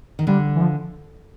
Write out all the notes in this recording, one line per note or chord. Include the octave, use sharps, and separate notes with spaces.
D#3
D3 G3
E3
F3